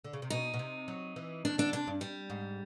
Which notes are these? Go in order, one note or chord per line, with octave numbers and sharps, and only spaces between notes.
D3
C#3
C3
B2 D#4
B2
C3
F#3
E3
D#3 D4
D3 D4
C3 D4
G2
G3
G#2